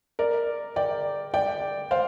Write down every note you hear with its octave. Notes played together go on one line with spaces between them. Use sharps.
A#4 D5
D5 G5
D5 G5
C5 F5